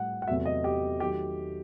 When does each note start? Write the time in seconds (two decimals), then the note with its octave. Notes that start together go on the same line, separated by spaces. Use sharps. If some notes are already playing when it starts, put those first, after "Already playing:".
Already playing: A2 G3 F#5
0.22 F#5
0.28 E2 C3 F#3 A3 E5
0.46 D#5
0.64 G4
1.00 D#3 F#3 A3 G4